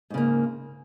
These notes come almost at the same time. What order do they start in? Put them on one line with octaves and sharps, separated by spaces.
G#2 C#3 A#3